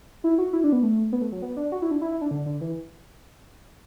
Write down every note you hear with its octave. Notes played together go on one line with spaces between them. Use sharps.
E4
F#4
E4
D4
B3
A3
B3
A3
F#3
B3
D4
F#4
E4
D4
E4
E4
D4
D3
D3
E3